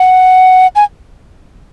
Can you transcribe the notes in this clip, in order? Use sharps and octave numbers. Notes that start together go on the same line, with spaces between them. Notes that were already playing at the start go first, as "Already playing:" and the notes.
Already playing: F#5
G#5